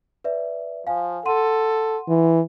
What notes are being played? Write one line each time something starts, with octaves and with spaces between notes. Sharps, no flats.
B4 D5 E5
F3 F5 G#5
A4 F#5 C6 D#7
E3